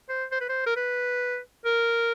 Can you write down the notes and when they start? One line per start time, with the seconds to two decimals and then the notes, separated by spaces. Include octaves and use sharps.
0.09 C5
0.32 C5
0.41 B4
0.49 C5
0.67 A#4
0.76 B4
1.65 A#4